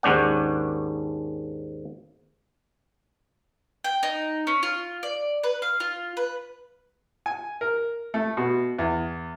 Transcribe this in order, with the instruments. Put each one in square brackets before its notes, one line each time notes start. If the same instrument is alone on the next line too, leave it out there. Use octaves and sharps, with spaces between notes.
[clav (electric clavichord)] D#2 G#2 C#4 D4 F#5
[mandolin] G5
D#4
C#4
F4
D5
B4
F5
F4
B4
[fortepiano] G#5
A#4
A3
B2
E2